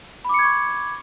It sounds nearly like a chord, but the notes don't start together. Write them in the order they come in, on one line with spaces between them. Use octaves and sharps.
B5 D6 C#7 G#6 C#6